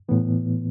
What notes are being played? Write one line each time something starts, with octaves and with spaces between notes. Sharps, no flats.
A2 E3 B3